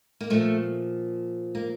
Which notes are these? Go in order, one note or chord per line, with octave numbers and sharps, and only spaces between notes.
A#3
A#2 F3 A3
A#3